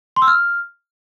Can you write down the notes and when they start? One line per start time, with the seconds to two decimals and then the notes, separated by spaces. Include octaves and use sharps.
0.16 C6
0.22 E6
0.27 F6